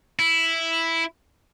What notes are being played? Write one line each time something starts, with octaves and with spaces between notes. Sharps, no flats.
E4